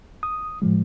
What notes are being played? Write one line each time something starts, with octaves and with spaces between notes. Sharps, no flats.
D#6
A2 F3 G#3